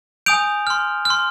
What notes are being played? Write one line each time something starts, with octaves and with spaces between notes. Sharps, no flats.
G#5 D#6 G6 D7 F7
C6 F6
C6 F6